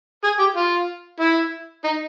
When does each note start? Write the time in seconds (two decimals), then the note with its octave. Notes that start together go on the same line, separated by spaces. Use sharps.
0.24 G#4
0.39 G4
0.56 F4
1.20 E4
1.84 D#4